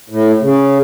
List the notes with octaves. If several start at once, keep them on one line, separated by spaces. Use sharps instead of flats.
A2
C#3